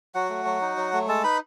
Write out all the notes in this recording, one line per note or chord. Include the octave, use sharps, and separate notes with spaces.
F#3 F#4 F#5
A3
F#3
D#4
F#3
A3
G#3 A4 A5
D#4 B4 B5